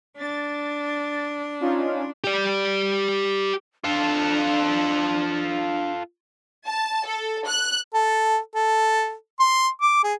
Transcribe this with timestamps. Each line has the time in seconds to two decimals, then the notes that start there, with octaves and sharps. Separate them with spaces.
0.18 D4 A6
1.60 C#4 D#4 F4
2.24 G4 D5
3.84 D4 F4 A4
6.67 A5
7.07 A4
7.47 F#6
7.94 A4
8.55 A4
9.40 C6
9.82 D6
10.04 G#4